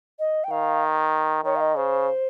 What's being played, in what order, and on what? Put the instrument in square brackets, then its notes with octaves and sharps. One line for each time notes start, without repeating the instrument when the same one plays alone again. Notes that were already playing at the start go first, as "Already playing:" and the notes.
[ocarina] D#5
G5
[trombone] D#3 [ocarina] F5
[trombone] D#3 [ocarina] C#5
[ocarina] F5
D#5
[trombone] C#3 [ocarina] C5